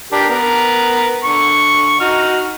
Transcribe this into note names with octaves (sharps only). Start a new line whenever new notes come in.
D4 G4 A#4
B3 A#4
D3 C#6
D#4 F#4 F6